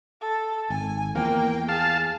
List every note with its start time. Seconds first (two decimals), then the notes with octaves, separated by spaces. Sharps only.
0.21 A4
0.70 G#1 G#5
1.15 E2 F3 A#3 G5
1.69 G#4 F5 A5